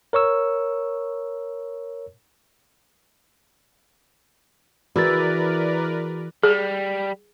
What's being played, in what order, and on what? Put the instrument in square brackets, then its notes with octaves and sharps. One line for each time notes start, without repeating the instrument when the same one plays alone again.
[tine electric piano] A#4 C#5 C#6 E6
[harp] E3 [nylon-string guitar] E4 [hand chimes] F#4 G#4 A6 [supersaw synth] A#4 B4 D5
[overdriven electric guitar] G3 [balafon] G#4